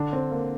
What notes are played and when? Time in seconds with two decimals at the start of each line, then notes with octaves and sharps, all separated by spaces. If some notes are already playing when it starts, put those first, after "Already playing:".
Already playing: D3 D4
0.13 C4
0.31 A#3